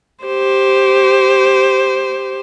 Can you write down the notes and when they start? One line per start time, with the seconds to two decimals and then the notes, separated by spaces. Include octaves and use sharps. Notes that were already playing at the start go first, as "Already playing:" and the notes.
0.25 G4 C5